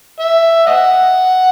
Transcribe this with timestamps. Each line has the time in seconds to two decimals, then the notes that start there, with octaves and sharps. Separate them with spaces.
0.20 E5
0.67 D#5 F#5